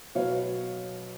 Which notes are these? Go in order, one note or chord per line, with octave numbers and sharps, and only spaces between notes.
B2 F#3 B3 C#5 F5